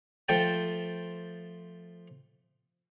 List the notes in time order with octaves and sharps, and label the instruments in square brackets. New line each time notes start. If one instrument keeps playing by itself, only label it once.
[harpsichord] F3 A3 C5 G5 A5